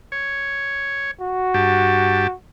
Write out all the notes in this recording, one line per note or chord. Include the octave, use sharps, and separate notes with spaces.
C#5
F#4
G2 G4 A5